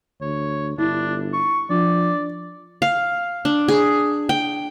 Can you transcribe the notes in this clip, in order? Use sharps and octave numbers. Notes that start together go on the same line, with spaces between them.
D2 C#5
G1 D4 E4
C#6
F3 D4 D5
F5
D4
G#4
G5